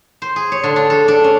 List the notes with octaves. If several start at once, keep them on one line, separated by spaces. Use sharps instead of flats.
C5
G#4
C#5
D3
D4
A4
D4
C#4